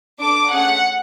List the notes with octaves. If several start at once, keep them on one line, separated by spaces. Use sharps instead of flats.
D4 A4 D6
A3 C#4 G#4 F#5